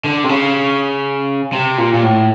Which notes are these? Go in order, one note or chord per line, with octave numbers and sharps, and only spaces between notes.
D3
C3
C#3
C3
A#2
A#2
A2